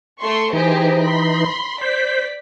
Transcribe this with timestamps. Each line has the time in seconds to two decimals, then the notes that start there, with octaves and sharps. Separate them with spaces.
0.21 A3 C6 C#6
0.53 E3 D#4 G4 G#4 C5
1.02 B5 C6
1.81 C5 D5 B6